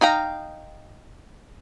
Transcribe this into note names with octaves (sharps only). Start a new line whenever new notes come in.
D#4 F5 G5 A#5